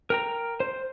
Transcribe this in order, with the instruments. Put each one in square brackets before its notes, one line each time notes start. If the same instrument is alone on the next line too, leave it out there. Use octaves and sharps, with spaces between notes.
[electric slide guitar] A#4 G5 A#5
C5